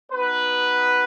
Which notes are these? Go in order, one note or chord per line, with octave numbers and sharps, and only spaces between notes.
B3 D#4 F#4 B4